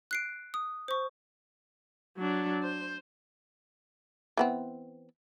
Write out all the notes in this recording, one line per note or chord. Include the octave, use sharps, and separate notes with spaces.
F#6 C7 D7
D#6
C5 C#6
F#3 D4
C5
E3 B3 C4